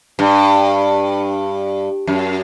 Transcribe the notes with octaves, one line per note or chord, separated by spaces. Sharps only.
G2
F#2